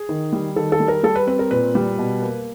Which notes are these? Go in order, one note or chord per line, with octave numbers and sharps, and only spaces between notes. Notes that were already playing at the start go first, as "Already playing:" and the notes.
Already playing: G#4
D#3
G3
D#3 A4
A4
G3
A#4
G3 A4
B4
C4 B4
A#4
A#2 B4
G3
B2
A#3